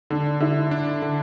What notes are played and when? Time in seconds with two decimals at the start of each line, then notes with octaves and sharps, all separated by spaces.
0.10 D3 D4
0.40 D3 E4
0.71 D4
1.02 D3